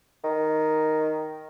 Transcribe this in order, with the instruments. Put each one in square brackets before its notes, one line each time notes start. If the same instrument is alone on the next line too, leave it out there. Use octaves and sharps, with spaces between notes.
[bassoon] D#3